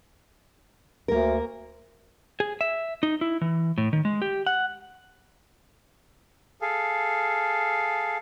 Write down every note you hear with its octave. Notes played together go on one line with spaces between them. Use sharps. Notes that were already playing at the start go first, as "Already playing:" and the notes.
D2 A#3 A#4
G#4
E5
D#4
E4
E3
A2
D#3
G#3
G4
F#5
G#4 A4 F5